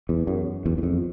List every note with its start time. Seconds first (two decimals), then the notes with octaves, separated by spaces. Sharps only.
0.09 E2
0.27 F#2
0.66 E2
0.78 E2
0.83 F2